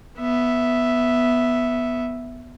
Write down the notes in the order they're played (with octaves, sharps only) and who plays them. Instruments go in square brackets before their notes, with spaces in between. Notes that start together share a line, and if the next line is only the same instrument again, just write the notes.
[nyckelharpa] B3 E5